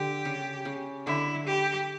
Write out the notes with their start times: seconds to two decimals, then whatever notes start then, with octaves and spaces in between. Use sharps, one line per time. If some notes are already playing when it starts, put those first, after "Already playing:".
Already playing: D3 G4
0.25 C#3
0.65 C#3
1.06 D3 E4
1.47 G4